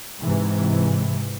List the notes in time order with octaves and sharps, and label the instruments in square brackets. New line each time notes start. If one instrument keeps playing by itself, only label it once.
[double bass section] G#2 C3 E3